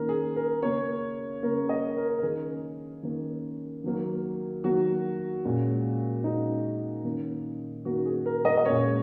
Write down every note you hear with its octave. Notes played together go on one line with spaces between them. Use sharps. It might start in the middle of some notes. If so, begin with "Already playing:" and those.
Already playing: D#3 A#3 C#4 A#4
G#4
A#4
C#3 A#3 C#4 C#5
C#3 A#3 C#4 A#4
D#5
A#4
A#4
D#3 A#3 C#4 G#4
D#3 A#3 C#4
D#3 F#3 A#3
D#3 F#3 A#3 F#4
A#2 G#3 C#4
A#2 G#3 C#4 D#4
D#3 A#3 C#4
D#3 A#3 C#4 F#4
G#4
A#4
D#5
D#5
A#2 G#3 C#4 C#5